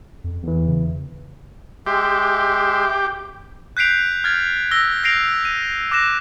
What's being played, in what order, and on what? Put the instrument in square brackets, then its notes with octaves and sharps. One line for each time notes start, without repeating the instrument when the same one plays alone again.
[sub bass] F2
[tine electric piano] E2 E3
[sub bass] C#3
[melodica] G#3 E5 C6 [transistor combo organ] G4
[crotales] F#6 G6 B6 C7 D7 F7
F6 G#6 A6
E6 A#6 G7
F#6 A#6 C7 D7 F7
D#7
D6 F#6 A#6 E7